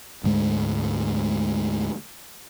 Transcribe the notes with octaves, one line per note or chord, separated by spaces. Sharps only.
D2 G#2 G#3